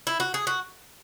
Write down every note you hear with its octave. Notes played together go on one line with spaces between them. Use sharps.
E4
F#4
G#4
F#4